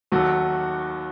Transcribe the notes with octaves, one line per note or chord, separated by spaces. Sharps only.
D#2 D#3 F#3 A3 F#4